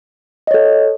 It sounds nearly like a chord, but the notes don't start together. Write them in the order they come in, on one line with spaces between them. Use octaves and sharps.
D#5 C#5 A4